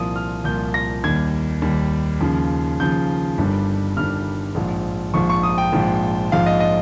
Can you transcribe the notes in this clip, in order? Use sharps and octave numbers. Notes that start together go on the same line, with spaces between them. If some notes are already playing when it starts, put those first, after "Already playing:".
Already playing: C2 A#2 F3 D#6
F6
C2 A#2 F3 G6
A#6
D#2 D#3 G3 G#6
D#2 D#3 G3
D#2 C#3 F3
D#2 C#3 F3 G6
G1 G2 D#3 G3
G1 G2 D#3 G3 F6
A#1 G#2 F3
A#1 G#2 F3 C#6
C#6
D#6
G5
A#1 G#2 F3
A#1 G#2 F3 F5
D#5
D#5